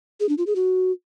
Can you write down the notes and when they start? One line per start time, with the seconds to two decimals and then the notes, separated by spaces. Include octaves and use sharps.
0.20 G#4
0.29 D4
0.38 F4
0.47 G#4
0.56 F#4